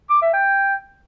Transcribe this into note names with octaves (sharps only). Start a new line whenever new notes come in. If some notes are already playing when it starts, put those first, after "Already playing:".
D6
E5
G5